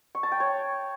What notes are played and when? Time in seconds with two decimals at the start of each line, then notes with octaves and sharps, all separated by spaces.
0.15 C#6
0.23 A5
0.32 G5
0.40 C#5